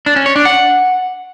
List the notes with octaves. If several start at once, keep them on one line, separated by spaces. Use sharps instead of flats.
D4
C#4
C#5
D4
F#5